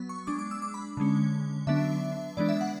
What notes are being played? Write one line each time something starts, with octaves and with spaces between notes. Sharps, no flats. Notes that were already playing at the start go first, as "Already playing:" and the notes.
Already playing: F#3 B3
C#6
G#3 D4 D6
D6
E6
D6
B5
D3 G#3 C#4
D3 F#3 B3 D4 E5
E3 G#3 B3 D4 D5
E5
F#5